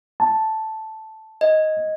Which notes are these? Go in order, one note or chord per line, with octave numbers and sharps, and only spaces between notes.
A5
D#5